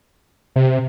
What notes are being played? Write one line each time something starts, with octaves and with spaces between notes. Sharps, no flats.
C3